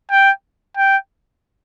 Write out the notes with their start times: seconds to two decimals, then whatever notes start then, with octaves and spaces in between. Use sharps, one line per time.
0.12 G5
0.77 G5